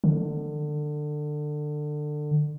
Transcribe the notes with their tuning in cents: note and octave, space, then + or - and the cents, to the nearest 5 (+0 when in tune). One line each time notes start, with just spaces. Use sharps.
D3 +25